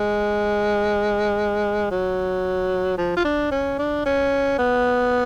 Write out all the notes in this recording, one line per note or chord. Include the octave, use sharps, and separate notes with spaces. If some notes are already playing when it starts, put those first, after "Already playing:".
Already playing: G#3
F#3
F3
F4
D4
C#4
D4
C#4
B3